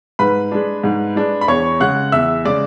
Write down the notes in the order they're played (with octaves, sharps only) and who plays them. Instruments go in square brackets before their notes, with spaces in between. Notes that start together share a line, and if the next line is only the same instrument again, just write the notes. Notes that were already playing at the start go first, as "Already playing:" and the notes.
[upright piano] G#2 B4 B5
G#3 D4
G#2
G#3 D4
B5
E2 C#5 C#6
C#3 G#3 F#5 F#6
E2 E5 E6
C#3 G#3 D5 D6